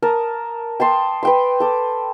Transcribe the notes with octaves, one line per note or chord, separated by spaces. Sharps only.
A#4 A5 D#6
G5 A5 C6 D#6
B4 G5 C6
A4 D6